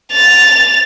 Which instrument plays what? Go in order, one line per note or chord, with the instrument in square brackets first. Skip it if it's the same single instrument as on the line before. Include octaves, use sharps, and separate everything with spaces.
[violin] A6 F7